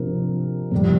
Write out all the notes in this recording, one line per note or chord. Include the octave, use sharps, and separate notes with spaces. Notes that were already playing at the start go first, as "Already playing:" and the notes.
Already playing: C3 F3 D4 A#4
F2 C3 G3